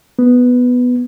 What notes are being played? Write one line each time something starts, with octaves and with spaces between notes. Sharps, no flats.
B3